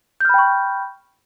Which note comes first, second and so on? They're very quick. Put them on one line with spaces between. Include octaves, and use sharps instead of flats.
G6 F6 B5 G5 C#6